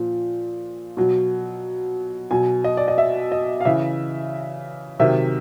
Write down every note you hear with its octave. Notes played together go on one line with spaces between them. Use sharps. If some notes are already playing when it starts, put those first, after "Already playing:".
Already playing: A#2 F3
B2 F#3
B2 F#3 G#5
D#5
D5
D#5
E5
D#5
F5
C#3 E3 E5
C3 D#3 F#3 E5